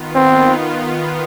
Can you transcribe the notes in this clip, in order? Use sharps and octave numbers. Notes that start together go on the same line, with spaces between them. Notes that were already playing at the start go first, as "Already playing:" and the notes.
Already playing: D#3 B3 F4
C4